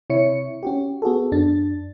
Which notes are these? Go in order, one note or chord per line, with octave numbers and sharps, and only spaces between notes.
C3 E4 C#5 C#7
C#4 F#4 G4
B3 F#4 G#4 A4
F#2 D4 A6